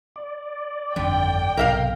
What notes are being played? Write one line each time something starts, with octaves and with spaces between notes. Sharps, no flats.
D5
G1 F2 D3 D#3 G5
B1 G#2 C3 A#4 E5 F5